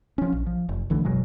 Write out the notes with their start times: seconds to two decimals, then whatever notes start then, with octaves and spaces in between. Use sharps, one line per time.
0.18 F3 C#4
0.33 A#1
0.47 F3
0.69 F1
0.90 B1 D3 E3 A3
1.05 F#1 B2 F#3 G#3